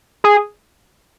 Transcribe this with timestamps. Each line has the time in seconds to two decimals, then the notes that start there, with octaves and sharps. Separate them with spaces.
0.24 G#4